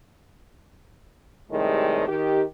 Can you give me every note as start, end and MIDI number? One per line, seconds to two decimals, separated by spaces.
1.51 2.07 45
1.51 2.07 48
1.51 2.07 51
1.51 2.07 55
1.51 2.07 56
2.08 2.42 51
2.08 2.42 67